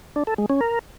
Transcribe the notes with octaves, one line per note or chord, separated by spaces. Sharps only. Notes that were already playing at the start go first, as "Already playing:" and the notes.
D4
A4
G#3
C#4
A#4